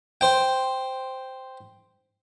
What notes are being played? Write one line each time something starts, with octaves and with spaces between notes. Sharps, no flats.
C5 G5